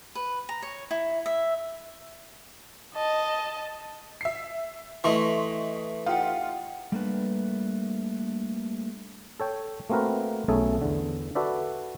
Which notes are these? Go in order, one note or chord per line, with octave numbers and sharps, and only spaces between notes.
B4
A#5
C#5
E4
E5
D#5 A5
E5 C7
E3 A3 D#5 C6 C#6
D#4 F4 G4 F#5
G3 A3 A#3 D4 B4
A4 C#5 G5
A3 A#3 C4 F#4 A#4 B4
B1 A3 C#4 G#4 A4
E2 D3
F#4 A4 B4 D5 E5